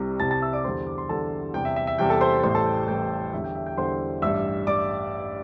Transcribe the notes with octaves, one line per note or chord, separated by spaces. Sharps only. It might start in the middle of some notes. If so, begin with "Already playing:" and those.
Already playing: C2 C3 G3
C2 C3 G3 A5 A6
A5 A6
E5 E6
D5 D6
E2 D3 G3 C5 C6
D6
C6
E2 D3 G3 A4 A5
E2 C3 G3 G5
E5
E5
E5
E2 C3 G3 G5
A4 A5
C5 C6
A1 A2 G3 C5 C6
A4 A5
G5
A1 A2 G3 G5
E2 D3 G3 E5
G5
E5
G5
E2 D3 G3 C5 C6
A1 G2 G3 E5 E6
G3 D5 D6